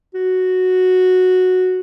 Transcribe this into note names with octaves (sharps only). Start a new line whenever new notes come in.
F#4